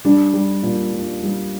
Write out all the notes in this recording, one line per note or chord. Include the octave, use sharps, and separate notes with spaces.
G3 D4
G3
A#2
G3
G3